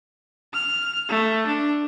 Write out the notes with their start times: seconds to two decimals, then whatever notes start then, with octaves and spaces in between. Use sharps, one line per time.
0.54 F6
1.09 A3
1.47 D4